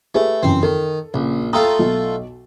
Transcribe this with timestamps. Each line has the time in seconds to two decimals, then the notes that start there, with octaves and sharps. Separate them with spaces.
0.15 A3 G4 G#4 B4
0.43 F#2 C#3 E3 C4
0.63 D#3 A4
1.14 A#1 C#3
1.53 A3 F4 A4 G5 A#5 D#6
1.79 B1